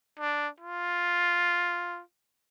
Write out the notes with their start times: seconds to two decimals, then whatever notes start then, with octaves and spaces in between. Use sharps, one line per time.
0.20 D4
0.60 F4